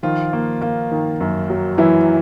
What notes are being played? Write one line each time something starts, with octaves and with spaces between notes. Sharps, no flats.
D#3 F3 F4
A#3
A#3
D#3
F#2
F#3
E3 F#3 E4